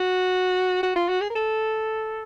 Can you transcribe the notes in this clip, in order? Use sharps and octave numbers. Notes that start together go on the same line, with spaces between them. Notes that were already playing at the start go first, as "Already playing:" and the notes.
Already playing: F#4
F#4
F4
F#4
G#4
A#4
A4